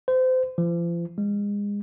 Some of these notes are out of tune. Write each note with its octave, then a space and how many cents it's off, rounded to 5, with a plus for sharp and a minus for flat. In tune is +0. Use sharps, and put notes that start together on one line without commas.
C5 -30
F3 -40
G#3 -30